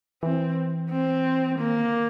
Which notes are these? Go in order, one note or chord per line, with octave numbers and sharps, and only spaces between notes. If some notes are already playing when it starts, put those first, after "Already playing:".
E3 C4
C4
D#3 A#3
D3